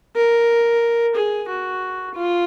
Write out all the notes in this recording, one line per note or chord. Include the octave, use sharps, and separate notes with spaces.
A#4
G#4
F#4
F4